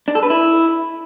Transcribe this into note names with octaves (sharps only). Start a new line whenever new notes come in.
D4
A4
B4
E4